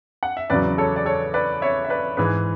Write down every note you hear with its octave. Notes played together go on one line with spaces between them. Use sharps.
F#5
E5
E2 C#3 F#3 B4 D5
A4 C#5
D5
A4 C#5
B4 D5
C#5 E5
E5
B4 D5
G#2 E3 G#4 B4